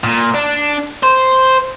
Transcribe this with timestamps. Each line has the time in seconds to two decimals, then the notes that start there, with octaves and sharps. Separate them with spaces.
0.04 A#2
0.34 D4
1.03 C5